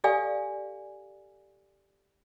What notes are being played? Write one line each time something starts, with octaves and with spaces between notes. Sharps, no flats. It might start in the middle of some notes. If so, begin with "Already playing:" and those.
G4 A4 D5 F5 G#5